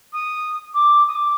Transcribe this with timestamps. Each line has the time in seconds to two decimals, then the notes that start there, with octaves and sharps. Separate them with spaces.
0.13 D#6
0.74 D6
1.08 D#6
1.15 D6